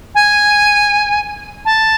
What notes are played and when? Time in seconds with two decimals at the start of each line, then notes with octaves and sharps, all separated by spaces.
0.15 G#5
1.65 A5